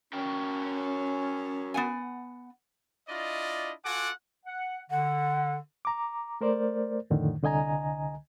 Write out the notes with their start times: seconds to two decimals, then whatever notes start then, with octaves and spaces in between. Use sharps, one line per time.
0.13 C#4 F#4 A#4 G5
1.74 B3 F#5 G#5
3.08 D4 E4 F4 D5 D#5
3.84 F4 F#4 A4 F#5 G#5 D6
4.46 F#5
4.91 D3 F#5
5.85 A#5 D6
6.41 A3 A#4 C5 D5
7.10 F2 A2 D3 D#3
7.43 C2 D3 D#5 G#5 A#5